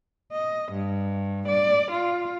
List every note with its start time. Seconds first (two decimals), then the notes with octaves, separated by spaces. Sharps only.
0.31 D#5
0.71 G2
1.47 D5
1.91 F4